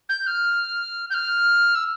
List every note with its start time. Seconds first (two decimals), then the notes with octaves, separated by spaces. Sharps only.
0.09 G6
0.26 F6
1.10 G6
1.14 F6
1.75 E6